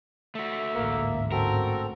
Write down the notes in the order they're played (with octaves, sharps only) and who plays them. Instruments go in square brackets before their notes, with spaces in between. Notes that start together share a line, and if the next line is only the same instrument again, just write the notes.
[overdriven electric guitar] A3 F#4 [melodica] E5
[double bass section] A1 D2 G#2 [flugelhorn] A#3
[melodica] C4 A4 [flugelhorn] F#4 [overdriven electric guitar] A#4